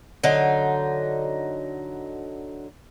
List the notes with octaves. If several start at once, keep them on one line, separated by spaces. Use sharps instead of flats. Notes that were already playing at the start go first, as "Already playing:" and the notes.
D3 F#3 D#4